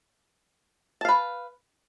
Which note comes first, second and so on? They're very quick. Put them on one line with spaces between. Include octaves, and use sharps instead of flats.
A5 F5 B4